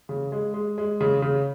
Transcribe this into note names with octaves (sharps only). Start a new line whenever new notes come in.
C#3
G#3
G#3
G#3
C#3
C#3